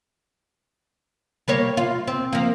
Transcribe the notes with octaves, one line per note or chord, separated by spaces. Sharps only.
G3 A#3 C#5
F4
C4
F3 A#3